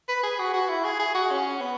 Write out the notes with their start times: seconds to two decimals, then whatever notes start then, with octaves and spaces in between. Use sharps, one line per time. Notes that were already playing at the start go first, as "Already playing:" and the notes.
0.08 B4
0.23 G#4
0.39 F#4
0.54 F#4
0.69 E4
0.84 G#4
0.99 G#4
1.15 F#4
1.31 C#4
1.61 B3